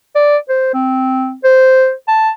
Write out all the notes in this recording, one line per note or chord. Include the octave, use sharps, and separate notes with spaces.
D5
C5
C4
C5
A5